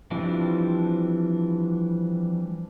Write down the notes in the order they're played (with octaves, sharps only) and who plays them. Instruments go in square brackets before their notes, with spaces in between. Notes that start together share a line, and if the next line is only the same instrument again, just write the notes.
[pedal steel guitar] E3 F3 G3 C4 D4